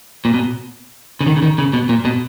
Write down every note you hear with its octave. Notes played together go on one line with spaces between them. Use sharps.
A#2
B2
C#3
D#3
C#3
D#3
C#3
B2
A#2
B2